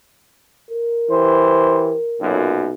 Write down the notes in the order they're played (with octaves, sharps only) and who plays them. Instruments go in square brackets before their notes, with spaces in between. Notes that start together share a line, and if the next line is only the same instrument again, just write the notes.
[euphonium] A#4
[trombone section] E3 G4 C5
B1 F#2 A#2